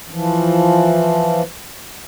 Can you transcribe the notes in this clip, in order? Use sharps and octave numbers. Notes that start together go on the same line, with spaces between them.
E3 F3